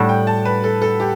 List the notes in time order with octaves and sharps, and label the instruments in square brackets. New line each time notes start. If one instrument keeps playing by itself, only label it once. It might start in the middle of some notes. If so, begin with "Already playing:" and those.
Already playing: [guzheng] A2 G3 D4 [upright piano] F#5
[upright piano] G5
A5
B4
A4
A4
G4